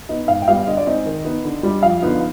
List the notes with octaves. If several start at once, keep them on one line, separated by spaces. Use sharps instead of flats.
B3 D#4 D#5
G#2 F5
G5
G3 B3 F5
D3 D#5
D5
G#3 C4 D#4 D#5
D#3
B3 D#4
D3
G3 D4
F2 F5
D3 F3 B3 D#4